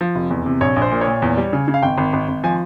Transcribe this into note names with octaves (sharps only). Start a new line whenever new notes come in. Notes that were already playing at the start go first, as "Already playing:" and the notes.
F3
F1
E2
C3
A#1 C#5
A#1
C5
A#2
C#5
A#2
E2
G3
C#3
C#3
F5
G#1 G5
G#1
G#1
G#1
F3 G#5